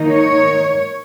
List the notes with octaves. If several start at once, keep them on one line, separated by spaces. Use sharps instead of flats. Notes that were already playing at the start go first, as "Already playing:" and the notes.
Already playing: D#3 A#3 D#4
C#5